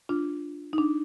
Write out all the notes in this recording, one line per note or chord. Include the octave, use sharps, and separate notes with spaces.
D4 F4
D#4
D4